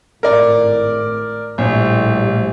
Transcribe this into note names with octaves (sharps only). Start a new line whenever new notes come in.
G#1 A2 A#4 D5
A#1 A2 G3